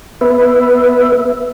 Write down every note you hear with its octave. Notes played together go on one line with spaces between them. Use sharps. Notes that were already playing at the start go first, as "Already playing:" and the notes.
B3 B4 E5